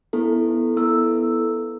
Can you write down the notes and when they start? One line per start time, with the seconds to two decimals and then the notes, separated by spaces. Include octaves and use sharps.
0.13 B3 E4 A4
0.77 B3 E4 A4 E6